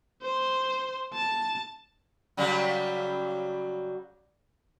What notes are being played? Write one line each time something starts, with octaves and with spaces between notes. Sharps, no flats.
C5
A5
C#3 F#3 G3